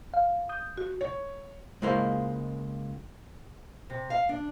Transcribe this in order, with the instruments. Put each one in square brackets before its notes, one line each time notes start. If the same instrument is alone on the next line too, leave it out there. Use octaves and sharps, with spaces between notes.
[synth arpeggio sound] F5
D#6 G6
[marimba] F#4
[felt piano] C#5
[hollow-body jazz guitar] C#2 G#3 A#3 E4 C5
[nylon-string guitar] C3
F5
D4